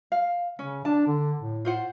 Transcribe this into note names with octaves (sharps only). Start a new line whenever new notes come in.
F5
C#3 C#4
D4 A5
D3
A2
F4 C5 F#5